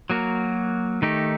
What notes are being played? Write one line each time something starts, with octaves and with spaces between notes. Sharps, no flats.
F#3 A#3 F#4 A#4
D#3 A3 D#4 G4